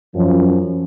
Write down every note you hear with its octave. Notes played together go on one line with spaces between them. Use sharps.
F#2 F3